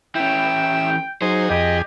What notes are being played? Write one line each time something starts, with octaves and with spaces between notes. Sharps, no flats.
E3 C#4 E5 G5
F#3 D#4 G#4 C5
F2 G4 G#4 D#5